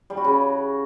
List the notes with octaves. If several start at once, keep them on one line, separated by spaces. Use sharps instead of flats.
G3
F#4
C#3